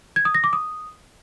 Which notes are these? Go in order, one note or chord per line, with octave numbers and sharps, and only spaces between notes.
G#6
D#6
A#6
D6
D#6